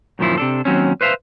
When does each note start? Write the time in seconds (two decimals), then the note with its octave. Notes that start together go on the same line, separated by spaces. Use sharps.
0.19 F#2 A#2 D#3 F3 E4 F4
0.38 C3 D4 A4
0.65 D#2 F#3 C4 C#4
1.01 B4 C5 E5 F5